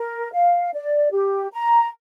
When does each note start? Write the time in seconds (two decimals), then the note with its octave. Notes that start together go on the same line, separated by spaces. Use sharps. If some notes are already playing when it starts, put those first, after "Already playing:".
Already playing: A#4
0.33 F5
0.72 D5
1.12 G4
1.52 A#5